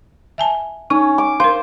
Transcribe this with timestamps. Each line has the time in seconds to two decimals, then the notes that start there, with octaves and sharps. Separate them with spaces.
0.38 E5 G#5 A5
0.90 C#4 D#4
1.18 D6
1.40 A#4 C5 F5